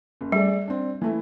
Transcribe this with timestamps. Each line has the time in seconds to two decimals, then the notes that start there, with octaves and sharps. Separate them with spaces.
0.21 F#1
0.32 G3 A3 G#4 D5
0.68 C4 D4
1.02 E3 A3 E4